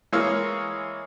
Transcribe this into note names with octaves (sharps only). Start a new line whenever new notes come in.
E3 G#3 A#3 C#5 F5 E6